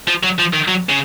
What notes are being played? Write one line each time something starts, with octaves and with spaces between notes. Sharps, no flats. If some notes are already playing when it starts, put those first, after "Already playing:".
F3
F#3
F3
D#3
F#3
C#3